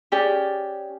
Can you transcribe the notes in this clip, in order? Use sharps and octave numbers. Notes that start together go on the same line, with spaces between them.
C#4 G4 G#4 D5